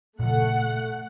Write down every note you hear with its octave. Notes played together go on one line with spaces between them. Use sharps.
A#2 C#3 F3 A3 F#5